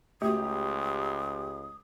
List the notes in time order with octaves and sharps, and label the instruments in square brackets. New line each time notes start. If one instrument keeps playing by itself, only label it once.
[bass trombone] C#2 [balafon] A3 F#4 [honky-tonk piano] G4 [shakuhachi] D#6